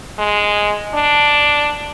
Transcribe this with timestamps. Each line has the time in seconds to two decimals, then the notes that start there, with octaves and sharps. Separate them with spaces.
0.19 G#3
0.94 D4